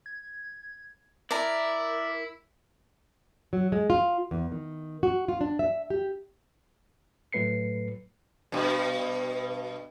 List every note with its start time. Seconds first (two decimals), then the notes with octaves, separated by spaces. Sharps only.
0.06 G#6
1.31 E4 A#4 D5 A#5
3.53 F#3
3.72 G#3
3.90 F4
4.31 E2
4.52 D#3
5.03 F#4
5.28 F4
5.41 D4
5.59 E5
5.90 G4
7.33 A2 F#3 A3 B4 C7 C#7
8.52 G2 B2